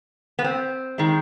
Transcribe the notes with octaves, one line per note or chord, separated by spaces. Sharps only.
B3
C4
D#3 G#3